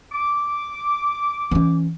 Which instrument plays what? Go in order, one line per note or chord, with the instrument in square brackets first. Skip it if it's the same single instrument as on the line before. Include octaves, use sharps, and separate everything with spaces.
[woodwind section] D6
[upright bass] E3 C#4